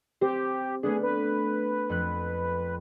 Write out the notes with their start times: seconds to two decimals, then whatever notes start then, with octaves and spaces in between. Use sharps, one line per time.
0.21 C4 G4 C5
0.83 A3 B3 D4 G#4
1.03 B4
1.89 F2 F#6